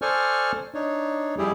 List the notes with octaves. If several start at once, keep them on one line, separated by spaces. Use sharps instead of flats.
A4 C5 D5 G#5 C#6 F6
D4 D#4 C#5
F2 G3 E4 G4 G#4